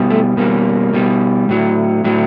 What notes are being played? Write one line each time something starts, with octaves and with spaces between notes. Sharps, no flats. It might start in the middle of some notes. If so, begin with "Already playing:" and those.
Already playing: B2 G3
A3
B2 G3 A#3
B2 G3
A2 F#3
A2 F#3